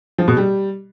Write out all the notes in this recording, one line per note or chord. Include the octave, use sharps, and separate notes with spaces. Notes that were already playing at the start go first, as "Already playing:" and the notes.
F3
B2
G3